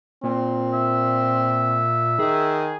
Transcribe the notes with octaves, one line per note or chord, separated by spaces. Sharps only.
A#2 C4
E5
D#3 G#4